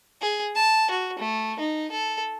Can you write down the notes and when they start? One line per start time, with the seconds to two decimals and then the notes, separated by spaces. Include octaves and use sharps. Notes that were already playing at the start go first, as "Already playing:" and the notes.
0.22 G#4
0.55 A5
0.90 F#4
1.19 A3
1.60 D#4
1.91 A4